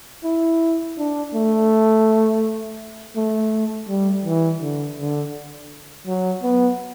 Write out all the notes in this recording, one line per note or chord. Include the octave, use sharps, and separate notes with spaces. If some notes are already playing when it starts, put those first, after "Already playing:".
E4
D4
A3
A3
G3
E3
D3
D3
F#3
B3